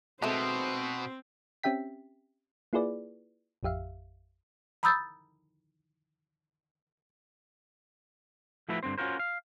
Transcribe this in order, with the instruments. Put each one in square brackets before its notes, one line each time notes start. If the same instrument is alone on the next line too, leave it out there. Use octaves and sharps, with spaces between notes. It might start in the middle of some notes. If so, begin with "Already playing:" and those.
[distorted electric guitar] B2 [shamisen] G#3 A3 [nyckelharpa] C4 [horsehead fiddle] C5
[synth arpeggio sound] C4 C#4 G4 E5 G5 B6
A#3 E4 F4 G#4 B4 D5
A1 F2 G4 E5 F5
[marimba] A#5 B5 D#6 E6 G6 A6
[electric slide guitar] F3 A3 E4 F#4 B4 E5
G2 D3 C4 C5
C#4 F4 F#4 A#4 C5
F5